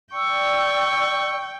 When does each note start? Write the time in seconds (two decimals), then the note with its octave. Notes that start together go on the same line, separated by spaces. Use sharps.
0.13 D5 G5 C#6 E6